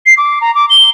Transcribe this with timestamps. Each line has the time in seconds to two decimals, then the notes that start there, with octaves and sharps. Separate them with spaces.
0.06 C7
0.18 D6
0.41 A#5
0.55 D6
0.70 G7